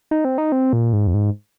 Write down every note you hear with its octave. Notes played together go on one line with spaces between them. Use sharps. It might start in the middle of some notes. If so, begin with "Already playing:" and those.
D#4
C4
D#4
C4
A#2
G#2
F2
G#2